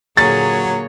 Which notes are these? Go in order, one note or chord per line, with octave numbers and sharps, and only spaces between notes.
A#2 D3 F#3 A#3 G#4 C#5 A6